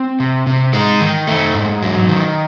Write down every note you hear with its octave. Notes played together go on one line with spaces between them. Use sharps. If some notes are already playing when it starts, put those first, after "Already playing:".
Already playing: C4
C3
C3
G#3 D#4
D#3
A3
G#2
F#3
D#3